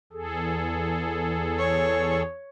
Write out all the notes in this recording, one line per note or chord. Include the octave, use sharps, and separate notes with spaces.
E2 G#4 A4
C#5